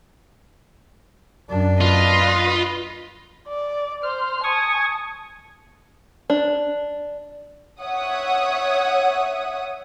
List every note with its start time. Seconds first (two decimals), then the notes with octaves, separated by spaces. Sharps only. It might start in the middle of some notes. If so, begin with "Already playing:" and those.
1.49 F#2 D4
1.81 F4 B4 D#5
3.47 D5
4.03 C5 F6
4.44 G#5 A5 C#6 D#6
6.30 D4
7.80 C#5 E5 F#5 D#6